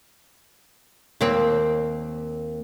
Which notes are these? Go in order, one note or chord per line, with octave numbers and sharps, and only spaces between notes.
D#2 A#3 C4